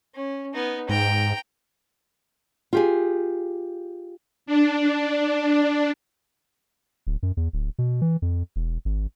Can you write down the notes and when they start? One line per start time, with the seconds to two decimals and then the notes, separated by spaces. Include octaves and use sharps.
0.14 C#4
0.54 B3 D#4
0.89 G#2 G5 A#5
2.73 F4 G4 G#4
4.46 D4
7.07 D1
7.23 F#2
7.37 E2
7.53 D1
7.79 B2
8.01 E3
8.22 F2
8.56 E1
8.85 G#1